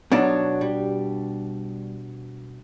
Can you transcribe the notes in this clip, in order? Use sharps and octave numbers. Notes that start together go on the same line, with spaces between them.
B2 F#3 D4 D#4
G3